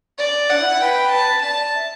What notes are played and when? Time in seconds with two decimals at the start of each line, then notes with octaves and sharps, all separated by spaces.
0.19 D5
0.50 D4 F#5
0.59 E4
0.70 E4
0.80 B4 G5
1.12 A5
1.42 D5 A5
1.74 E5